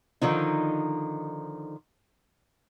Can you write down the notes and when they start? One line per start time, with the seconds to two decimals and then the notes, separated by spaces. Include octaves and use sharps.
0.21 D3 D#3 F3 D#4